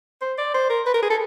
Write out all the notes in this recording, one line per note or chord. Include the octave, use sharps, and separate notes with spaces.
C5
D5
C5
A#4
B4
A#4
G#4
A4